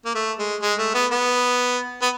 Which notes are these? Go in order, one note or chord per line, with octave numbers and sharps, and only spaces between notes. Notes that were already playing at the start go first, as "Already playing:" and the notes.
A#3
A3
G#3
G#3
A3
B3
B3
B3